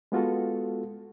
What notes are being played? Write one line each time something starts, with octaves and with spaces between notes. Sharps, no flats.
G#3 B3 F4 F#4 A4